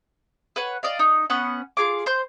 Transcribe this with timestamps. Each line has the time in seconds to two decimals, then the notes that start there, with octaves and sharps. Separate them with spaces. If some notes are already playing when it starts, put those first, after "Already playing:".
0.56 B4 C#5 F#5
0.83 D5 D#5 F5
0.99 D#4
1.30 B3 C#4 F#5
1.77 F4 G#4 D6
2.06 C5 C6 G6